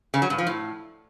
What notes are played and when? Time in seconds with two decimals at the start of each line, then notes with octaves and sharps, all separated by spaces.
0.14 C#3
0.22 F#3
0.30 G2
0.38 F3
0.47 A2